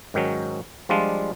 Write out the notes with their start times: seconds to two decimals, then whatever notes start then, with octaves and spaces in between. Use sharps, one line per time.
0.14 G#2 D#3 F#3 C#4
0.89 F3 G3 G#3 D4 F4